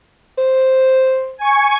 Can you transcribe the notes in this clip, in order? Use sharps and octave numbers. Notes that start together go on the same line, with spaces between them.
C5
G#5 C#6